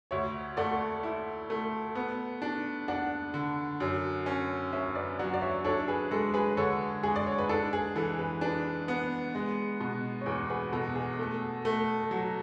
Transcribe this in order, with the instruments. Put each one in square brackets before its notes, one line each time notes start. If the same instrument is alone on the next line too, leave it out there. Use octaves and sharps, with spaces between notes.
[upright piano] D2 [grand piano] C#5 E5
[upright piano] A3 [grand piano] D5 F#5
[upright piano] E4
A3
B3
D4
[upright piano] D4 [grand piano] D5 F#5
[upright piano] D3
F#2
C#4
[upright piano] C#4 [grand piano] C#5 E5
[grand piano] B4 D5
[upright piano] F#3 [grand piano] D5 F#5
[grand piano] D5
C#5 E5
[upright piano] D4 [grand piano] A4 C#5
[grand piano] G#4 B4
[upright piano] G#3 [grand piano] A4
[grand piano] G#4 B4
[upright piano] D3 [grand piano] A4 C#5
[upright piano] G#3 [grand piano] G#4
[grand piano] D5
C#5
B4
[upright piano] D4 [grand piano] A4
[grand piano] G#4
[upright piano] E3 [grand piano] A4
[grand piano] G#4 B4
[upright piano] D4 [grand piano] G#4 B4
[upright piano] B3
G#3
B2
[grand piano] C#5
[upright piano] E2 [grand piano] G#4 B4
[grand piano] G#4 B4
[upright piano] B2 [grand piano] A4
[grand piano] G#4
[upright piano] A3
A3
F#3